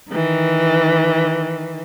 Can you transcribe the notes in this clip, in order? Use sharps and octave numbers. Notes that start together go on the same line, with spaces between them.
D#3 E3